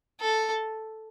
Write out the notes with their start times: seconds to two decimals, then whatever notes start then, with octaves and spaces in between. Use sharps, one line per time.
0.21 A4